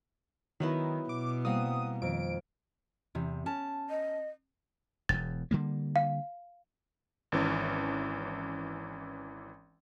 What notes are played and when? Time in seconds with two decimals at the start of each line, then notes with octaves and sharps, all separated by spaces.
0.60 D#3 F#3 B3 E4
1.09 B2 D6
1.45 G3 A#3 C4 F#5 D#6
2.02 F2 D#3 D7
3.15 E2 C3
3.46 C#4 A5
3.90 D#5
5.09 E1 E2 A6
5.51 D3 G3 A#3
5.96 F5
7.32 G#1 E3 C#4